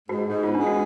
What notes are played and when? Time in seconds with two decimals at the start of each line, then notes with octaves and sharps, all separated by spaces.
0.09 G#2 F#4
0.26 G#2
0.43 B3 F4
0.55 D4
0.60 G#3
0.67 F#4